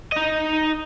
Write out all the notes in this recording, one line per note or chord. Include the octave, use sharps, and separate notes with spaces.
D#4 D#5